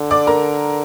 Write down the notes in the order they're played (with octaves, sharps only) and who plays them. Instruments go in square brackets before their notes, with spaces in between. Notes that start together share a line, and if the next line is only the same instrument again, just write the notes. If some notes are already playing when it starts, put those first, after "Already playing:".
Already playing: [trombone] D3
[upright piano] D5 D6
A#4 A#5